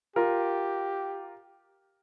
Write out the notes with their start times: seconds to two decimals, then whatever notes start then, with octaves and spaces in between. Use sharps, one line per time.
0.16 F4 G4 A#4